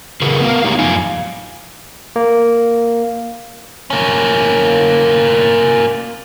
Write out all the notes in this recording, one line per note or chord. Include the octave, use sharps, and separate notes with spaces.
C#3 F#4 G#4 A#4 B4
B3 A#4 F5
G#3 D#4 G4 C#5 A#5
F#2 F3 F5 G#5
A#3
A#3 C#4